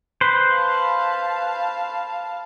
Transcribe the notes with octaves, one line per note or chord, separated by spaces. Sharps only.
B4 C5
F5 A5